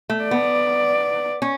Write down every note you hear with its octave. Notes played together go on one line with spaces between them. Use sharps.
A3
D5
B3
C#4